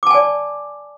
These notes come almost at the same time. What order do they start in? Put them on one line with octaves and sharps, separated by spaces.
D6 A5 G#5 D5